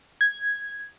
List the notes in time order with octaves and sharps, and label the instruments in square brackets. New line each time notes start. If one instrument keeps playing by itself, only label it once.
[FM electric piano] G#6